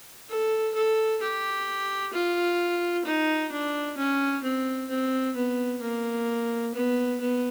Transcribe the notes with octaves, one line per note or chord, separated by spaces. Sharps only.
A4
A4
G4
F4
D#4
D4
C#4
C4
C4
B3
A#3
B3
B3